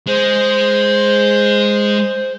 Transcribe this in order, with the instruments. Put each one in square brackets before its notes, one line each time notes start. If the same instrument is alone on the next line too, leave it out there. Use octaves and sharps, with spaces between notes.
[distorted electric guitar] G#3 [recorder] C5